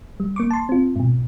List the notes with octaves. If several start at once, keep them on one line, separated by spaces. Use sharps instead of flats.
G3
A#3 C#6 D6
A5 C6
C4 F4
G#2 B2